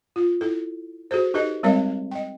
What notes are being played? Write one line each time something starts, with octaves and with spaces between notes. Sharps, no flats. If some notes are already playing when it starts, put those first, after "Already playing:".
F4
E4 A4
F#4 G#4 A4 C5
D#4 G4 A4 B4 D#5
G3 G#3 C4 A#4 C#5 D#5
D#5 G5